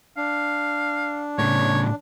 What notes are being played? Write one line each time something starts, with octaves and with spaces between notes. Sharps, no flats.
D4 F5
A2 C#3 C#5